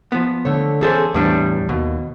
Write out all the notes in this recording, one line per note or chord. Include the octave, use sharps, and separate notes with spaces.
F3 B3
D3 A3 C#5
E2 C#4 G#4 A4 C5
E2 A2 E3 G3 D4
D#2 B2